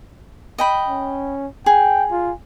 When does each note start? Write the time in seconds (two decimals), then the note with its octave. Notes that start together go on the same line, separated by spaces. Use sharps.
0.58 D#5 G5 B5
0.89 C#4
1.66 G#4 G5
2.11 F4